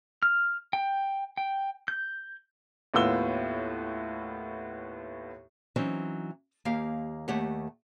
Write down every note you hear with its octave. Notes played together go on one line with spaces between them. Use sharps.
F6
G5
G5
G6
D#2 A2 B3 F4 E6 G7
E3 F#3 C4 C#4 D#4
D#2 A#3 G4 F5
D#2 A3 G4 C#5 F#5